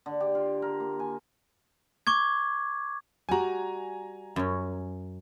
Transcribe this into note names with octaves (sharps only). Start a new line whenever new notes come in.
D3
G4
F4
A#4
A#3
G#5
C#6 D6 G#6
G3 F#4 G#5 A#5
F#2 C#4